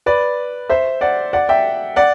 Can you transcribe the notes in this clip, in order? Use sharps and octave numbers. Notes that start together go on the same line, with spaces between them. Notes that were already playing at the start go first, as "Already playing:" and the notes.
B4 D5
C5 E5
D5 F#5
D5 F#5
E5 G5
D5 F#5